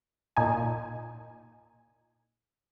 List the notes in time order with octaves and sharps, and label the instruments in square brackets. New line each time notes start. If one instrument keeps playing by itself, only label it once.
[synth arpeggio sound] A#2 D#4 G#5